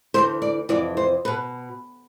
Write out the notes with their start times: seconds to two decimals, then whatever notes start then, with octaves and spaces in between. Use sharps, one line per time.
0.14 D2 C3 E3 C5
0.42 D5
0.69 F2 C3 E3 D5
0.97 C5
1.25 B2 B4